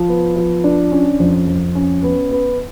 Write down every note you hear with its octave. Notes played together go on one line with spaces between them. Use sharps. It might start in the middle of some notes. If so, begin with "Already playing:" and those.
Already playing: F3
B3
F3
D4
C#4
F2
F2
C#4
B3
B3